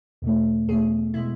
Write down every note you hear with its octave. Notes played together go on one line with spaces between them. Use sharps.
E2 B2 A3
E2 B2 A3 G#4
B2 G#3 E4